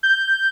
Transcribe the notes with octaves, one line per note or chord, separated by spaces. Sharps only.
G6